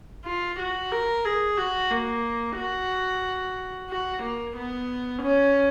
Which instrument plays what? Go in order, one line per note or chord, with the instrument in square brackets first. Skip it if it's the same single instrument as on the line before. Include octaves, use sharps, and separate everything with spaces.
[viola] F4
F#4
A#4
G#4
F#4
A#3
F#4
F#4
A#3
B3
C#4